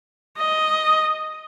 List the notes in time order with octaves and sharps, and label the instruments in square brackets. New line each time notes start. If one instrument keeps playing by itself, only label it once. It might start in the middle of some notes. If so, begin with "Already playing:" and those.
[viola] D#5